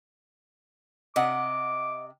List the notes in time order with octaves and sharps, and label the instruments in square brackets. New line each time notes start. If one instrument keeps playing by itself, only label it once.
[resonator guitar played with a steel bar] C3 F#5 [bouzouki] D#5 [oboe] D6